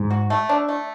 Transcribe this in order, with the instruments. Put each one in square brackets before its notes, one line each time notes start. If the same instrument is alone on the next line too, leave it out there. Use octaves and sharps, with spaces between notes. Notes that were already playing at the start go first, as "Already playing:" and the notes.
Already playing: [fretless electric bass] G#2
[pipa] F#4
A3
D4
A3